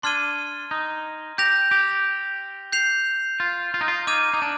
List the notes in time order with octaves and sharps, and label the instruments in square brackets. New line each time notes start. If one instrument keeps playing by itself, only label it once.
[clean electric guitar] D4 [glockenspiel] C6 F6 G#6 D#7 G7
[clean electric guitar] D#4
[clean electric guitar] G4 [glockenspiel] G6 A#6 F7
[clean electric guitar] G4
[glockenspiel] G6 C7 F7
[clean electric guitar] F4
F4
D#4
F4
[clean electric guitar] D#4 [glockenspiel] D6 F6 G#6 D#7
[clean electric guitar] D#4
D4